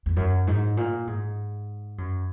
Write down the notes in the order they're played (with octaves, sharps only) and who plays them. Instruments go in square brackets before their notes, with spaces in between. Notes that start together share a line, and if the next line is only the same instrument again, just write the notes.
[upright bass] E2
F#2
G#2
A#2
G#2
F#2